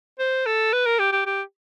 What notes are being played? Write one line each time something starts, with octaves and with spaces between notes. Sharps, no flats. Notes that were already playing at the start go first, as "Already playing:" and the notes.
C5
A4
B4
A#4
G4
G4
G4